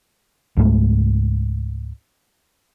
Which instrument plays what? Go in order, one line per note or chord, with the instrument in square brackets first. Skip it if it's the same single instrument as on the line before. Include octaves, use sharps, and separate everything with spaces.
[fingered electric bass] C#2 G#2 G#3 A3